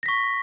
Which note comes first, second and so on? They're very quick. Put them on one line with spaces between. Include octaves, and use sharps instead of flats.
A#6 B6 C#6